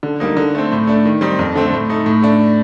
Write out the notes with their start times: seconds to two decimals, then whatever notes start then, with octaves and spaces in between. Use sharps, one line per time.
0.03 D3
0.20 G3 A#3 D#4
0.37 D3
0.55 A3 C4
0.72 A2
0.87 A3 D4
1.05 D#3
1.21 G3 C4 D#4
1.39 F2
1.55 D3 A3 C4
1.72 A2
1.90 A3 D#4
2.06 A2
2.22 A3 D4